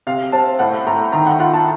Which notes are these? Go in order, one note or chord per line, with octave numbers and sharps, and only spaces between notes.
C3 F5
C4 A5
A2 F#5
A2 A#5
D#3 A#5
F#5
F4 F#5
A5